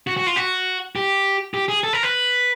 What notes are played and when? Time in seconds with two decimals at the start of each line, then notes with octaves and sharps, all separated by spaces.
0.07 F#4
0.17 F#4
0.27 F4
0.36 F#4
0.96 G4
1.54 G4
1.68 G#4
1.83 A4
1.93 A#4
2.03 B4